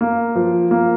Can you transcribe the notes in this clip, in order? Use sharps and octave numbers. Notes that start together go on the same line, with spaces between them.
A#3
F3
A#3